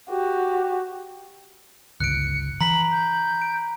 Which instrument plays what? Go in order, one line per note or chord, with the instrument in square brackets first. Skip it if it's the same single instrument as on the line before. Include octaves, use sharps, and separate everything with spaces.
[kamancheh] F#4 G4
[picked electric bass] G1 C#2 [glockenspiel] F#6 D7 [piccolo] C#7
[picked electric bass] E3 [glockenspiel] A#5 B5 B6 [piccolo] F#7
[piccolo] G6
[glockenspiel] D7